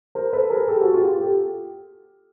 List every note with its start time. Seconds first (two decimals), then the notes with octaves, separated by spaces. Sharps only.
0.15 A#4 C5
0.33 A4 B4
0.50 G#4 A#4
0.68 G4 A4
0.81 F#4 G#4
0.94 F4 G4
1.20 G4 A4